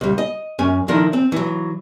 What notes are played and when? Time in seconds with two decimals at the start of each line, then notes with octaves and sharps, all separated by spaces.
0.01 C#2 G3
0.18 D#5
0.59 F#2 C#4 G#5
0.88 D3 D#3 F3 E4 A#4
1.13 C4
1.32 E3 F#3